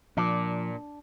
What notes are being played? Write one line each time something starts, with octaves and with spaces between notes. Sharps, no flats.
A#2 F3 D4